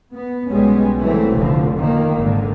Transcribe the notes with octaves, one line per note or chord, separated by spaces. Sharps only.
B3
B1 G3 G#3 B3 C#4
E3 F#3 A3 C4
F1 D3 F3
D#3 A#3
G#1 D3 D#3